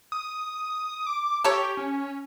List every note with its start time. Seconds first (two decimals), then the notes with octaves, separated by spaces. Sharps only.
0.12 D#6
1.06 D6
1.44 G4 A4 C#5
1.77 C#4